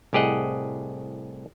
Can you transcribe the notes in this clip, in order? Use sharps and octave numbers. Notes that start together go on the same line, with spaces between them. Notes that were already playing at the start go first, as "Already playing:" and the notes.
C2 A2 G4 G#4 D#5 F#5